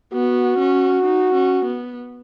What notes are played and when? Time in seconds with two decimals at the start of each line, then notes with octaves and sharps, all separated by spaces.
0.13 B3 F#4
0.59 C#4
1.04 D#4
1.34 C#4
1.65 B3